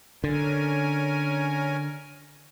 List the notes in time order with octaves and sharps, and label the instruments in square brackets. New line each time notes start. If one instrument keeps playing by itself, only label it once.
[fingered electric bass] D3 [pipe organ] C#4 A#4 G#5